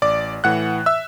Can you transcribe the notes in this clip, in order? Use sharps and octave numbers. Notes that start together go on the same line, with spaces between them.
A1 D5 D6
A2 E3 F#5 F#6
E5 E6